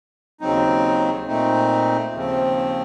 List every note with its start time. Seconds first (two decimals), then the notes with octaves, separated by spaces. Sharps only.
0.41 D#2 C#3 F#3 C4 D#4
1.27 A#2 A3 C4 D#4
2.14 D#2 C#3 F3 C4